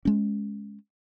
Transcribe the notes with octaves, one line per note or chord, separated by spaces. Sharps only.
G#3 C#4